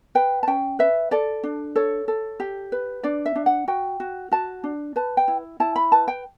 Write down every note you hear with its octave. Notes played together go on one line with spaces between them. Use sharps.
B4 G5
A5
C#4 G5
B4 E5
A4 D5
D4
A4 C#5
A4
G4
B4
D4 D5
E5
D4
F#5
F#4 G5
F#4
F#4 A5
D4
B4 A5
G5
E4
E4 A5
B5
B4 A5
G5